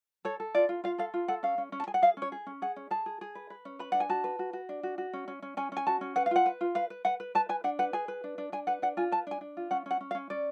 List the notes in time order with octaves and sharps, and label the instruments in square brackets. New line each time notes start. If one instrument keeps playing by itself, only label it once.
[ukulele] A4 C#5
A4
F4 D5
F4
F4 F5
A4 F5
F4
A4 F#5
C#4 F5
C#4
C#4
A5
G#4 G#5
F#5
G#4 F5
C#4 C#5
G#4
C#4
G#4 F#5
C#4
G#4 A5
G#4
G#4
B4
B4
C#4
B4 B5
D4 F#5
G#5
F#4 A5
B4
F#4
F#4
D4
F#4
F#4
C#4
C#4
C#4
C#4 G#5
C#4 G#5
F#4 A5
C#4
B4 F#5
F5
F4 F#5
B4
F4
B4 F5
B4
B4 F#5
B4
B4 A5
B4 G#5
D4 F#5
B4 F#5
G#4 G#5
B4
D4
D4
D4 G#5
B4 F#5
D4 F#5
F4 G#5
B4 A5
D4 G#5
D4
F4
C#4 F#5
C#4 F#5
C#4
F5
C#4
C#4 D5